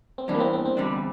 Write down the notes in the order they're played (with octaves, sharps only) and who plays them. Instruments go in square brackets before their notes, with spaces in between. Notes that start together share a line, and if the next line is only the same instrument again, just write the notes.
[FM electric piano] C4
[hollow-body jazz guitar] E2 E3 G3 [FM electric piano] D4
[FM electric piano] A#3
C4
C4
C4
[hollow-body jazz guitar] E2 D3 G3 D4